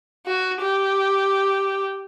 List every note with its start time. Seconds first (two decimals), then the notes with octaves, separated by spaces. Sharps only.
0.27 F#4
0.61 G4